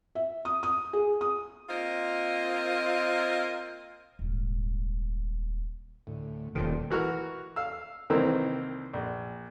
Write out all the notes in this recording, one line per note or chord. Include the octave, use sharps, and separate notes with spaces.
E5
D#6
D#6
G#4
D#6
A#3 C4 F4 A#4 C5 D#5
D#1 G#1
D2 A2
D#1 A#2 D#3 G4 A4 C5
E3 F#4 A#4 F6
F5 E6
C2 D#3 E3 A#3 C4 E6
A#1